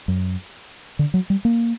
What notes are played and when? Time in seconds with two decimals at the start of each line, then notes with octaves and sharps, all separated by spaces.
0.08 F#2
0.99 D3
1.14 F#3
1.30 G3
1.45 A#3